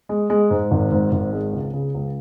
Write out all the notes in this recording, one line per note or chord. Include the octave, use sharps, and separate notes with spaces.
G#3
G#3
G#2
G#1
G#2
G#1
G#3
C#2
C#3
C#2